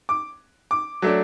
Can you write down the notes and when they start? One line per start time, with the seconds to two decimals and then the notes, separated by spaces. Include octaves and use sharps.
0.09 D6
0.71 D6
1.02 F#3 A3 D4